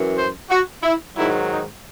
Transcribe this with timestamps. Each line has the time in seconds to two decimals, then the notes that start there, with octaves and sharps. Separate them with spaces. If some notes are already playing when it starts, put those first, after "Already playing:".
Already playing: F#2 E3
0.15 C5
0.49 F#4
0.83 E4
1.16 G#2 D#3 F#3 E4
1.50 D#4